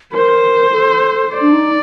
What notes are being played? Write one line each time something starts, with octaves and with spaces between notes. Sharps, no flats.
A#4 C5
A4
D5
D4
D#4